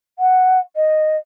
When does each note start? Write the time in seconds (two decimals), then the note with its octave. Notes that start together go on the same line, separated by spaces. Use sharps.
0.19 F#5
0.76 D#5